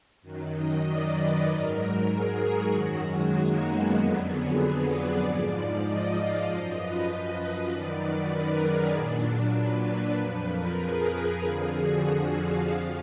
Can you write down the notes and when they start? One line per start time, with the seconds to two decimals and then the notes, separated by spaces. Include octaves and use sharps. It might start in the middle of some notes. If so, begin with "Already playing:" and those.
0.22 F#2 D#3 F#3
0.53 D#5
0.84 D5
1.15 B4
1.46 G#2 F#3 A#4
2.08 G#4
2.40 F#4
2.71 F#2 D#3 F#3
3.02 G#3
3.32 A#3
3.63 B3
3.96 F2 D3 F#3
4.26 G#4
4.57 B4
4.88 D5
5.19 G#2 F3
5.81 D#5
6.13 F5
6.44 F#2 F3 D#5
6.75 B4
7.06 B4
7.37 D#5
7.68 F#2 D#3 F#3 D5
7.99 B4
8.30 A#4
8.61 G#4
8.93 A#2 F#3 D4
9.54 B4
10.17 F2 F3 B4
10.47 A#4
10.78 G#4
11.10 A#4
11.41 F2 D3 F3 G#4
11.72 F#4
12.34 F5
12.66 F2 F3